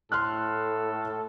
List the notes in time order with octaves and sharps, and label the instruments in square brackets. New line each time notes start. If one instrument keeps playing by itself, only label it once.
[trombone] A2 [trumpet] A4 [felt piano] C6 F6 F#6